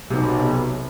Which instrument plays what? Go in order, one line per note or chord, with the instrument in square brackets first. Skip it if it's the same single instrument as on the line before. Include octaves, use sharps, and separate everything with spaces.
[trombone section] B1 [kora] C3